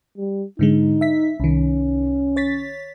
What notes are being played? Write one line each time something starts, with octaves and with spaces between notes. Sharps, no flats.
G3
G#2 D3 G#3 D#4
E5 B6
C2 D#3 C#4
C#5 A6 B6